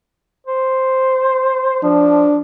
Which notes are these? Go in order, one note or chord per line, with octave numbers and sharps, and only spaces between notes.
C5
F3 D4